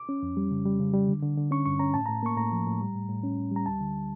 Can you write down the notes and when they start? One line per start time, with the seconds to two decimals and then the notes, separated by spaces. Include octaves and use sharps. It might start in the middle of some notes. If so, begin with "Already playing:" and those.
Already playing: D6
0.09 C#4
0.23 F2
0.37 G3
0.51 C#3
0.65 G3
0.80 C#3
0.94 G3
1.08 D3
1.22 D3
1.37 D3
1.51 C#4 C#6
1.66 G2 C#6
1.79 C#4 A#5
1.94 A2 A5
2.06 A2 A#5
2.23 A#3 C#6
2.37 A2 A#5
2.52 F3
2.67 A2
2.81 G3
2.95 A2
3.09 A2
3.24 C#4
3.38 A2
3.51 G3 A#5
3.66 D2 A5
3.80 D3